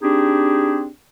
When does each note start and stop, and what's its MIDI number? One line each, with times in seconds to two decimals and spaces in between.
0.01 0.87 60
0.01 0.87 62
0.01 0.87 63
0.01 0.87 67
0.01 0.87 68